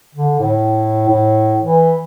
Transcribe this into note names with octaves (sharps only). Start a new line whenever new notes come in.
D3
A2
A2
E3